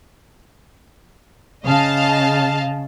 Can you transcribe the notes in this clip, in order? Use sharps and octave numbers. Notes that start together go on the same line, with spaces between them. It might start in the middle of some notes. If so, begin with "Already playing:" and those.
C#3 D#5 F5 A5